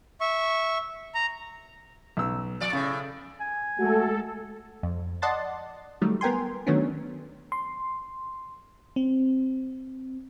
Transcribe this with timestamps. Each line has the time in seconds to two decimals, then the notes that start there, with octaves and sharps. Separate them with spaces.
0.21 E5 C#6
1.14 A#5
2.17 B1 E6
2.60 F3 D5
2.73 A2 C#3
3.40 G#5
3.79 G#3 A3 F#4 A4
4.83 F2
5.22 D5 D#5 F#5 A5 C6 A6
6.01 D#3 F#3 G3 A3
6.21 B3 A#4 G5 G#5 C6
6.67 D#3 F#3 A3 B3 C#4 D4
7.52 C6
8.96 C4